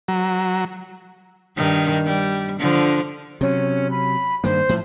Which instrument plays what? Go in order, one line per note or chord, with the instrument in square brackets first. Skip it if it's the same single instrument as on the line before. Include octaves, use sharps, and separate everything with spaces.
[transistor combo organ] F#3
[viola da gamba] G2 D#3
G3
D3 F3
[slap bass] C3 F#3 [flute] C#4
[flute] B5
[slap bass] G2 D#3 A#3 [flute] C5
[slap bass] A2 F3